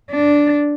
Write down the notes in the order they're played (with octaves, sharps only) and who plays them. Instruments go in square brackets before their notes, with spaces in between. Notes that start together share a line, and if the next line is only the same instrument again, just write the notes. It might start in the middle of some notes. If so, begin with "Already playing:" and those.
[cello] D4